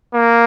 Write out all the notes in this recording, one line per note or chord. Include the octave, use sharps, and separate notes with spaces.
A#3